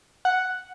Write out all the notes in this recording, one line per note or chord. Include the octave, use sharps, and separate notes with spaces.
F#5